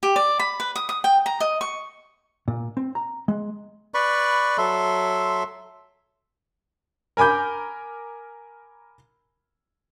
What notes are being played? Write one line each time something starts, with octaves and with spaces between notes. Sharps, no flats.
G4
D5
B5
B4
D#6
D#6
G5
A#5
D#5
C#6
A#2
C4
A#5
G#3
B4 D5 B5 C#6
F#3 A4 E5 C6
A#4 G#5 B5 D6 G6